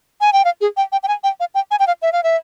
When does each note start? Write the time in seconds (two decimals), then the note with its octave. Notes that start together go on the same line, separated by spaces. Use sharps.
0.21 G#5
0.33 G5
0.45 F5
0.61 G#4
0.77 G5
0.92 G5
1.03 G5
1.08 G#5
1.24 G5
1.40 F5
1.55 G5
1.71 G#5
1.79 G5
1.87 F5
2.02 E5
2.13 F5
2.23 E5